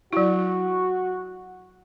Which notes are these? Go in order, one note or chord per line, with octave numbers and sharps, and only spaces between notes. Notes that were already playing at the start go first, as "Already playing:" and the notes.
F#3 E4 F#4